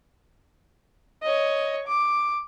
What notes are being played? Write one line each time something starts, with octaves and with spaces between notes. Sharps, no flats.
C#5 D#5
D6